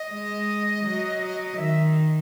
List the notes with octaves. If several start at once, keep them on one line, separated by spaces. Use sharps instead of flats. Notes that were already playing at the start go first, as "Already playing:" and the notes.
Already playing: D#5
G#3
F#3
D#3 E5